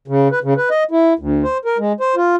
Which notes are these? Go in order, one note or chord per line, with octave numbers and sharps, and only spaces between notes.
C#3
B4
C#3
B4
D#5
E4
D2
C5
A#4
G#3
C5
F4